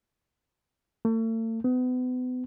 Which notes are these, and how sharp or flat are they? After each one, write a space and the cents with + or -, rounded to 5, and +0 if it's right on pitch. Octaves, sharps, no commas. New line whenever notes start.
A3 +40
B3 +35